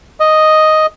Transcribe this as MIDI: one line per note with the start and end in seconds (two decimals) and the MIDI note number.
0.20 0.86 75